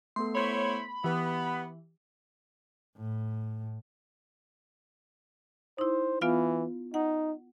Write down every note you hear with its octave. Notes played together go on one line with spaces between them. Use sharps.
A3 B3 A4 C6
E4 C5 C#5 B5
E3 B3 G4
A2
D#4 E4 C5
E3 B3 F4 F5
D#4 F#5